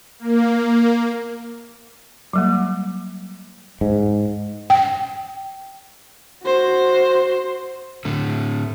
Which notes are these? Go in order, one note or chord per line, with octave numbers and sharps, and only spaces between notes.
A#3
A#3
F#3 G3 A#3
G#2
G5
F#4 C5
A2 D3